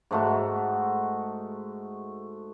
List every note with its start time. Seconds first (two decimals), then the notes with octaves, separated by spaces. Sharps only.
0.11 G#2 A3 F#4